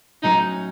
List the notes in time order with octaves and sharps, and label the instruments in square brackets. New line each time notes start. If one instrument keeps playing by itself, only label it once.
[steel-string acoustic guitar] A2 F#3 C#4 [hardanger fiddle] D#4